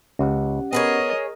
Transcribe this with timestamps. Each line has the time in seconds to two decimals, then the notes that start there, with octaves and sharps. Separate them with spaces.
0.19 C#2 C#4 G4 F#5
0.73 B3 G#4 A#4 B4 C#5 D#5